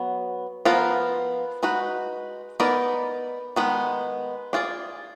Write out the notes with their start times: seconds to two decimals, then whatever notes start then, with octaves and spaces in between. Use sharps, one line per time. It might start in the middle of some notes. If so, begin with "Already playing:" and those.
Already playing: F#3 B3
0.65 F3 B3 F4 A#4
1.63 G#3 D#4 F#4 B4
2.60 B3 D#4 A#4 D5
3.56 D#3 G#3 B3
4.53 D4 F4 G#4 D5